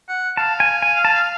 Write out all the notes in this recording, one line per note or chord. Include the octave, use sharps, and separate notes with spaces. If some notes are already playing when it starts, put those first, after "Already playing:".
F#5
F5 A5
G#5
G#5
A5